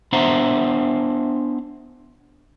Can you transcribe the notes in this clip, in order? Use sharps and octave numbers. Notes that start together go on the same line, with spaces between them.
B3 D4 C5 E5 F#5 A#5